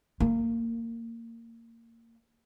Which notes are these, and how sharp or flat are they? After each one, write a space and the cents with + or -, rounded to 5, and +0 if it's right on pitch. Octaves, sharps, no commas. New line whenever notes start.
A#3 -20